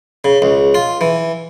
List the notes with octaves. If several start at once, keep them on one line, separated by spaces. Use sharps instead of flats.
C#3
C#2
F4
E3